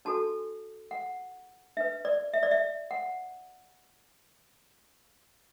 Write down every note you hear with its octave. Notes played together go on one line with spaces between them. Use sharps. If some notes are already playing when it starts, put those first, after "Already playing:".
D4 F#4 A4 A5
F#5
D4 B4 E5
D5
E5
D5
E5
F#5